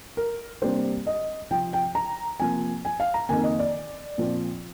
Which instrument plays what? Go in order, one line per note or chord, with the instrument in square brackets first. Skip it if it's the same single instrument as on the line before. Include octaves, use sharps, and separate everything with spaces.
[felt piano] A#4
C3 G3 A#3 D4 C5
D#5
C3 F3 C4 G5
G5
A#5
C3 F3 A#3 G#5
G#5
F5
A#5
F2 D#3 A#3 G#5
D#5
D5
A#2 F3 C4